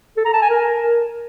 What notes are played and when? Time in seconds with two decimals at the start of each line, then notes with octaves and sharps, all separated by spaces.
0.17 A4
0.25 A#5
0.33 A5
0.42 G#5
0.50 A#4